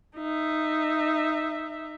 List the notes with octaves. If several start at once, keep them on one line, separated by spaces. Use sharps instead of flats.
D#4 E5